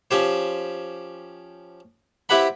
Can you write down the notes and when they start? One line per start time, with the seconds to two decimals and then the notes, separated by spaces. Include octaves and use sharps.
0.11 F3 C#4 G4 C5
2.29 C4 E4 G4 B4 F#5 B5